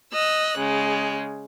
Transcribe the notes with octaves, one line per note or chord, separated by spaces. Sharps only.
D#5 E6 F#6
C#3 G#3